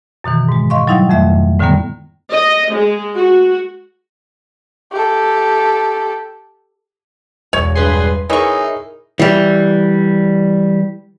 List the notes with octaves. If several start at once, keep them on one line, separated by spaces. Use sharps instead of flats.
F#2 B2 D#3 E3
G#2 G#3
D#5 F5 C6 C#6
F#3 G3 D#4 E4 F5 F#5
F2 D#3 A3 E5
A2 D3 D#3 G3 A#3 B3
D#5
G#3
F#4
G4 A4
E1 C#5
G2 G#4 B4 C6
E3 D#4 E4 G#4 A#4 C#5 C#6
E3 G3